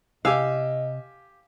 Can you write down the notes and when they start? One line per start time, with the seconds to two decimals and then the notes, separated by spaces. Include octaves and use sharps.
0.25 C3 G4 D#5 F5 G#5 E6